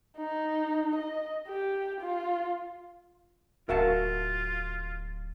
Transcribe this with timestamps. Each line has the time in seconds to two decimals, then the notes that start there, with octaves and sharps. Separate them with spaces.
0.17 D#4
0.95 D#5
1.48 G4
2.00 F4
3.69 D1 F4 F#4 A#4 E5 F5 A5